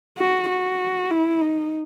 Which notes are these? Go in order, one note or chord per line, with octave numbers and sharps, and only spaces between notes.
F#4
F#4
E4
D#4